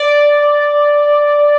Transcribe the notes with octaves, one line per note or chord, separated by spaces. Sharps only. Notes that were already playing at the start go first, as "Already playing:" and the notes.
Already playing: D5